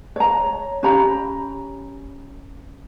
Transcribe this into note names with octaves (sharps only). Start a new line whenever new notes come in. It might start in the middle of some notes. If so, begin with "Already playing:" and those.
C#5 A#5
C#4 G4 A#5 B5